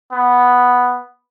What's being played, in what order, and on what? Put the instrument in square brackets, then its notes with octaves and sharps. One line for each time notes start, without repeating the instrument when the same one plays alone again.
[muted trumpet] B3